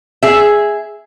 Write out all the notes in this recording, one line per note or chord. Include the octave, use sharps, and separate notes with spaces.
G#4 E5